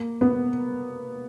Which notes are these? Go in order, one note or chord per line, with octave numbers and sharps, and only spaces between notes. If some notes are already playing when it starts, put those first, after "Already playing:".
Already playing: A#3
B3